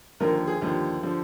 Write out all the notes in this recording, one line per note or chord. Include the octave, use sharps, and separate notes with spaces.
D#2 D3 F3 A#4
G#4
D#2 D3 F3 G4
D3 F3